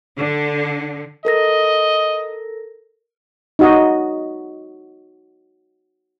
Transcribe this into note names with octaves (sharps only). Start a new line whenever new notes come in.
D3
A4 A#4 D#5 A#6
D#4 F#4 D#5